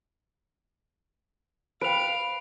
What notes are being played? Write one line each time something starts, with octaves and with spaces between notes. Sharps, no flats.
B4 C5 F5 G5 D7 F7